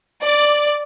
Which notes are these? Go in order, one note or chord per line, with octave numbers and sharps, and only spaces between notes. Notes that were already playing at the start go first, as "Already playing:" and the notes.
D5